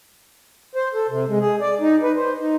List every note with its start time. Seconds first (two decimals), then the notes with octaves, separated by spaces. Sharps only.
0.75 C5
0.94 A4
1.09 C3
1.28 G#3
1.40 G#4
1.61 D5
1.81 D#4
2.03 B4
2.16 C5
2.40 D#4